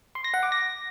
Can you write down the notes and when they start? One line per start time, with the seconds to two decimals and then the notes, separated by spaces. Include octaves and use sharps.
0.15 C6
0.24 A#6
0.34 F#5
0.43 D6
0.52 A#6